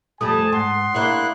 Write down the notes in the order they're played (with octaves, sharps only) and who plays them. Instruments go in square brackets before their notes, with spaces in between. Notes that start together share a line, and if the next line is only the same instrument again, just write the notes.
[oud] F2 G3 A3 [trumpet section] G#5 A5 [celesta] D#6
[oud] G#2 [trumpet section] F#5 C6
[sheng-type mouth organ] A#3 E4 F#6 [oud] D4 G#4 C#5